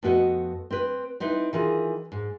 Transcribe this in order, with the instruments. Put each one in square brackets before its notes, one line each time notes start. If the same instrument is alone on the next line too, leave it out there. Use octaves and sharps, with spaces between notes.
[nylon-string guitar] F2 B3 F#4 G#4 A4 D#5
C4 B4
C4 D#4 E4 B4
D#3 E3 F4 G#4
G#2